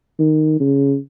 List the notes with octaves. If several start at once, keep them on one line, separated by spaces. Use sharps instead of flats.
D#3
C#3